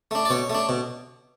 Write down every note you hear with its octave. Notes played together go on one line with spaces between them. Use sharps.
A3 D4
D5
B2 C#5
A3 D4
B2